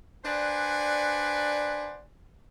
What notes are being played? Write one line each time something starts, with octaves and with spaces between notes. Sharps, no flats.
D4 B4 C5 D5 F#5 G#5